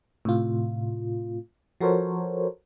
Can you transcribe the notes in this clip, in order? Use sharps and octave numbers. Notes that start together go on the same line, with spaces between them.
A2 C3 F4
F3 F#4 A4 A#4 C5 C#5